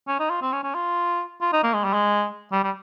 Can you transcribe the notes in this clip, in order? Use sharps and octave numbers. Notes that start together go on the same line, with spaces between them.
C#4
D#4
F4
C4
C#4
C#4
F4
F4
D#4
A#3
G#3
G3
G#3
G3
G3